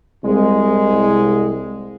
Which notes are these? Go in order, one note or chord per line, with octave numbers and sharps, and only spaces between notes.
C2 G#3